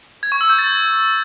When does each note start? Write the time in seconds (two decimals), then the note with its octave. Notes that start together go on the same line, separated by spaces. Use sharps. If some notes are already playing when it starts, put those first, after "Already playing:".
0.23 G#6
0.32 C#6
0.41 E6
0.50 G6
0.59 A6